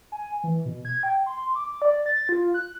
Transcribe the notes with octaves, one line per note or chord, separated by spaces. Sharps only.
G#5
E3
B2
G#6
G5
C6
D6
D5
A6
F4
F#6